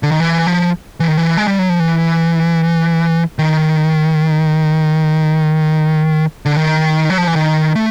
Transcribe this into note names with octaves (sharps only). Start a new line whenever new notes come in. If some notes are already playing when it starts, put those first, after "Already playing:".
D3
D#3
E3
F3
E3
D#3
E3
G#3
G3
F#3
F3
E3
D#3
D3
D#3
F#3
F3
E3
D#3
A3